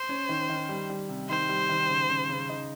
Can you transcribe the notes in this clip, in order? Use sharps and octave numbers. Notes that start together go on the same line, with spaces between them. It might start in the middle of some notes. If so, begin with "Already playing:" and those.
Already playing: C5
C#4
D#3
D#3
G3
G3
C3
D#3 C5
G3
D#3
C#3
C#3
C#3
D#4